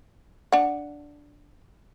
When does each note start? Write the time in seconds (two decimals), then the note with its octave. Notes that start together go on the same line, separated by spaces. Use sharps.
0.52 D4 F#5